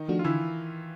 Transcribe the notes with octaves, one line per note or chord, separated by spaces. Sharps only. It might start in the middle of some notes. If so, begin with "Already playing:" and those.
Already playing: D#3 D#4
F3 A3 D4 F#4
F4
D3 E3 E4